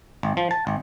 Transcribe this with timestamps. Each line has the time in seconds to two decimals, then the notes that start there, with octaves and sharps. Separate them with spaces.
0.23 G#1
0.37 F3
0.51 A5
0.67 G#1